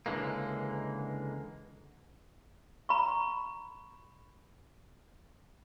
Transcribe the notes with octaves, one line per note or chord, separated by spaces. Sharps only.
C#2 D3 E3 G#3 A#3
A#5 B5 C#6